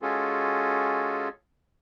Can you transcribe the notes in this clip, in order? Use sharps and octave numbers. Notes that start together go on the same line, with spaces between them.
G#3 C#4 F4 F#4 G#4 A4